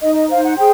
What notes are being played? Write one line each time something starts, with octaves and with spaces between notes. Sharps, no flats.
D#4 D#5
D#5
C5 F5
F#5
G#4 G5